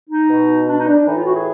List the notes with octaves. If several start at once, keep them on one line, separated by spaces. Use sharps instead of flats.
D#4
B2
D4
D#4
D4
A2 E3 D#4
F4
F#4
G#4